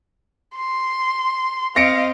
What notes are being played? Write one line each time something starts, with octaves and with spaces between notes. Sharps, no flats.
C6
C4 D#5 F5 A#6 C#7 D7